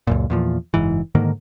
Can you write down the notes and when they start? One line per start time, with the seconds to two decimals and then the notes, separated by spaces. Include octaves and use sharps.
0.07 C#2 F#2 A#2
0.30 E2 A#2 F3
0.74 F#1 G#2 E3
1.15 G#2 D3 D#3 A#3